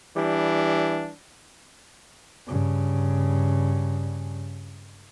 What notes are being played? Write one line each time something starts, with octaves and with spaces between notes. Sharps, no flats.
E3 G3 D4
G2 C#3